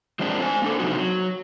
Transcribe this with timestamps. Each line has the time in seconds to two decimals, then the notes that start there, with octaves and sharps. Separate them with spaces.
0.19 F3 G#3 C4 D4
0.42 C5 G#5
0.62 A#3 D4 A4
0.79 C3 E3 F3 C4 D#4 F#4
0.97 F#3